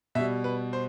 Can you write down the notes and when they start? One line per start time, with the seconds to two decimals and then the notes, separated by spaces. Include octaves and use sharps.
0.15 B2 E5
0.19 G3
0.44 B4
0.73 C5